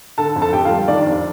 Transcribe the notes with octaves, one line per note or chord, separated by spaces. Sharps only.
D3 A4 A5
F2
A4 A5
F2 G4 G5
F4 F5
G3
D#3 D4 D5
F2